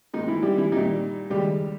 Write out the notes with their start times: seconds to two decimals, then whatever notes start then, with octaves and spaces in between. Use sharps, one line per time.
0.14 G#2 D#3 G#3 D#4
0.28 E3 E4
0.43 G3 G4
0.58 E3 E4
0.72 A#2 D#3 G3 D#4
1.30 D#2 C#3 G3 G#3 G4